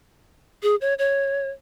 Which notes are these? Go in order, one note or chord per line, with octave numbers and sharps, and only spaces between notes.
G#4
C#5
C#5